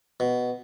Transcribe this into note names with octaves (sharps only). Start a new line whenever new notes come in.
B2